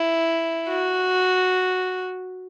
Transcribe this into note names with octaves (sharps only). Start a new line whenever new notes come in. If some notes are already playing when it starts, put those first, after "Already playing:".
Already playing: E4
F#4